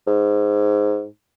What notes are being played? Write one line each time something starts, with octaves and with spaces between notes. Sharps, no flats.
G#2